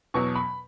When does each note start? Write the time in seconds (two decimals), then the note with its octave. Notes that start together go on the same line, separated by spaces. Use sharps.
0.14 E2 B2 F#3 C#6
0.36 B5